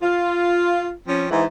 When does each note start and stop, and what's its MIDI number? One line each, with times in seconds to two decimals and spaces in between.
0.02 0.92 65
1.07 1.26 53
1.07 1.26 60
1.07 1.26 61
1.31 1.44 44
1.31 1.44 52